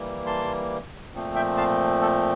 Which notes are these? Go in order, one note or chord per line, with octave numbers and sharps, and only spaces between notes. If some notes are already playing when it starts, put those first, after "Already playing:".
Already playing: E3 G3 A#3
A5 C6
A#2 F3 A3 C4
E5 G5
F5 A5
A4